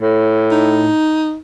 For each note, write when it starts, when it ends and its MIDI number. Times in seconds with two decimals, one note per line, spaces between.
0.02 0.90 45
0.51 1.37 63